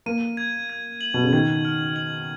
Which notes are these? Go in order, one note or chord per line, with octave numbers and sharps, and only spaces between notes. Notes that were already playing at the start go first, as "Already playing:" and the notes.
A#3 D#7
G#6
G#6
F#7
B2
C#3
D#3 G#6
F6
F#7